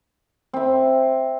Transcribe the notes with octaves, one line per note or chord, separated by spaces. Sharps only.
C4 E5